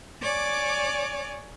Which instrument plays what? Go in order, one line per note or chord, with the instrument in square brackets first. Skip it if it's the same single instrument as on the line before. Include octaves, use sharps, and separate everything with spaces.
[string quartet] C#5 D5 G#5 D6